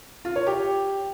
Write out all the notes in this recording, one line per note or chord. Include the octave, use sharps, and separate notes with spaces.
F4
C#5
G4